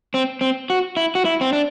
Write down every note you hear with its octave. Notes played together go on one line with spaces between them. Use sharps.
C4
C4
F#4
E4
F#4
E4
C4
D4